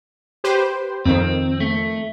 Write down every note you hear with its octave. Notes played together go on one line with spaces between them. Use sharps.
G4 B4 C5
F2 D#3 C4
A3